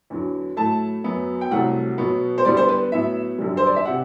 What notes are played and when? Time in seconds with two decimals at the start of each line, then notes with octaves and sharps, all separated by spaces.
0.10 E2 D3 F#3
0.57 A2 F#3 A3 A5
1.04 F#2 F#3 B3
1.41 G5
1.51 C2 C3 F#3 A3 F#5
1.98 B2 F#3 B3
2.38 C5
2.44 E2 D3 G3 B3 D5
2.57 C5
2.68 B4
2.92 A2 F#3 B3 E5
3.38 F#2 D3 G3
3.57 C5
3.67 D5
3.76 E5
3.85 C3 F#5